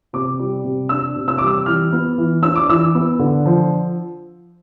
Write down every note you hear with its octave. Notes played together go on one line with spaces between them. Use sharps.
C3 D6
G3
C3
D4 E6
C3
E6
G3 D6
E6
E3 F6
B3
E3
D4 E6
D6
E3 E6
B3
D3
F3